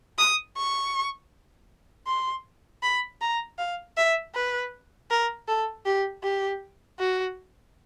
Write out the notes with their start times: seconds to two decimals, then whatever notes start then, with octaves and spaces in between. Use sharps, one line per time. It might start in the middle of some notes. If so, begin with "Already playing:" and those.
0.18 D#6
0.57 C#6
2.07 C6
2.83 B5
3.21 A#5
3.59 F5
3.97 E5
4.34 B4
5.11 A#4
5.48 A4
5.86 G4
6.23 G4
6.99 F#4